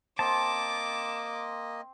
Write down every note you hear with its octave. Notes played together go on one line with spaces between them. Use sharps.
A#3 C4 D#5 A5 D6